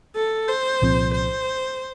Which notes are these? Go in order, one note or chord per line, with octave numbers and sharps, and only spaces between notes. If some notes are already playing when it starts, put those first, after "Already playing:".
A4
C5
C2 A#2 F3 C4
C5